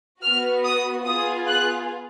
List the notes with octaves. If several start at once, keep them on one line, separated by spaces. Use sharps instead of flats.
B3 F#4 F6
D#6
B3 F4 G#4 D#6
F#6